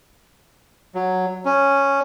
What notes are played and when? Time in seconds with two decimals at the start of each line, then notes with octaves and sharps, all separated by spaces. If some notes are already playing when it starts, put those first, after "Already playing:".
0.95 F#3
1.45 C#4